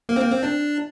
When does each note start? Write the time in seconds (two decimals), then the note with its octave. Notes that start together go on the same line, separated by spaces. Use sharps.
0.09 A#3
0.16 C4
0.20 A#3
0.31 C4
0.43 D4